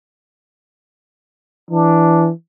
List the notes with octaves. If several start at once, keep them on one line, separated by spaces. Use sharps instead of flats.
E3 D4